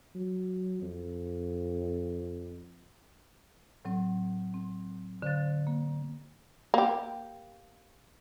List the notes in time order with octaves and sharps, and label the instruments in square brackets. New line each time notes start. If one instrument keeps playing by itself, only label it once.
[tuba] F#3
F2
[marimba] A2 F#3 C4 A4
C4
D3 C4 C5 F5 F#6 A6
A#3
[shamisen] A#3 G4